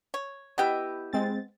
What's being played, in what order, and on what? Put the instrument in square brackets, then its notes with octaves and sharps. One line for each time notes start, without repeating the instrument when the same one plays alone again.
[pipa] C#5
[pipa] B3 G5 [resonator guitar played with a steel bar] E4 G4 D#5
[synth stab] G#3 C4 A6